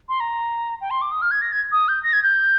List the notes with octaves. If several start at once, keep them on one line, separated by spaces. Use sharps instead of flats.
C6
A#5
G5
C6
D6
D#6
F6
G#6
A#6
G#6
D#6
G6
A#6
G#6
G6